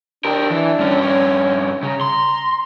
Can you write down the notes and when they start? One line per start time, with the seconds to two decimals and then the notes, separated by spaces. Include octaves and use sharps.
0.25 D4 G4 A#4
0.51 E3
0.79 G2 C#4
1.01 C#5
1.83 C#3 A#5
2.01 C6